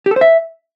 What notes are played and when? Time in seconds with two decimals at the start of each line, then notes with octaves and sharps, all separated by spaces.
0.06 G4
0.11 A4
0.16 C5
0.21 E5